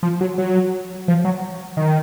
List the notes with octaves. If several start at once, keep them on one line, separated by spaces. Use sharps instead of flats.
F3
F#3
F#3
F3
F#3
D#3